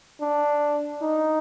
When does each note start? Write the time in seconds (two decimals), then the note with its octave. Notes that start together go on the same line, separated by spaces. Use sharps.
0.21 D4
1.02 D#4